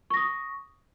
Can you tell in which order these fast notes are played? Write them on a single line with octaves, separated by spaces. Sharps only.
C#6 A#6 D#6